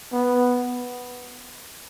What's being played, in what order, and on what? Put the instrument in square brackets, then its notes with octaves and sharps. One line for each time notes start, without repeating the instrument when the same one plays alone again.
[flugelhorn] B3